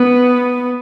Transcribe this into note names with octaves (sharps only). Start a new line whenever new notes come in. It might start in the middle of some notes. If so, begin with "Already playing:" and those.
Already playing: B3